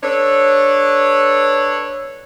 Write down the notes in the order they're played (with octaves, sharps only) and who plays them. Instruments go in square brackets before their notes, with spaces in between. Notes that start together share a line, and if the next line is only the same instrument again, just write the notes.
[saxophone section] D4 A4 B4 C#5